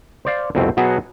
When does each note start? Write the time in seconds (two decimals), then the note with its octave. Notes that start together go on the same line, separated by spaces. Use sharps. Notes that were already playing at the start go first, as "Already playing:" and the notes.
0.25 C5 D5 F5
0.55 C2 F2 B2 A3 C4
0.77 B2 F#3 B3 F#4 G#4